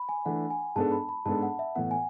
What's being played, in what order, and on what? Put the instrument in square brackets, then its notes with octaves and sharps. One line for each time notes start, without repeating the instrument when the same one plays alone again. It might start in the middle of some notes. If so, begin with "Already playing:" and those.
Already playing: [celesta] B5
G#5
[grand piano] E3 A3 D4 [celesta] F#5
[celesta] G#5
[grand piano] G#2 G#3 B3 D4 A4 [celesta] A5
[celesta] B5
B5
[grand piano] G#2 G#3 B3 D4 A4 [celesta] A5
[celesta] F#5
E5
[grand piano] A2 E3 B3 [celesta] F#5
[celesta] G#5